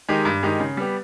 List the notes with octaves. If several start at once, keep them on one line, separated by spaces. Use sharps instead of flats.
D#3 G#3 D#4 G4
G2
D#3 G#3 D#4 G4
C#3
G3 B3 G4